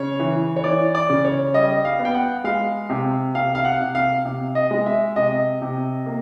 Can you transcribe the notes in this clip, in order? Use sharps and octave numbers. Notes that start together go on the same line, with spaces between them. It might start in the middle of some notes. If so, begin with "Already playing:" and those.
Already playing: C#3 C#5
E3
C#5
E3 D5
D5
C#3
C#5
G3 D#5
F5
B3
G5
F#5
G#3 F5
C3
C3 F5
F5
F#5
C3
F5
C3
D#5
G#3
E5
C3 D#5
C3
A#3